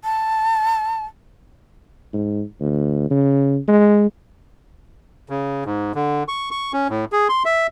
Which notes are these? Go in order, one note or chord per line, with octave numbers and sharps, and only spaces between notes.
A5
G#2
D2
C#3
G#3
C#3
G#2
D3
C#6
C#6
C#4
A2
G#4
C6
E5